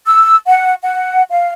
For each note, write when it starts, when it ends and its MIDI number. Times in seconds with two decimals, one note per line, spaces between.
0.06 0.35 88
0.48 0.73 78
0.83 1.23 78
1.30 1.53 77